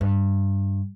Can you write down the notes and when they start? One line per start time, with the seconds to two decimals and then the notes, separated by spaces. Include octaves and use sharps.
0.01 G2